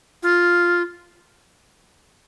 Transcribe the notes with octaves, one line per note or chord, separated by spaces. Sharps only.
F4